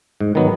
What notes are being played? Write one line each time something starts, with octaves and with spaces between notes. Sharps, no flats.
G#2
D#3 F#3 B3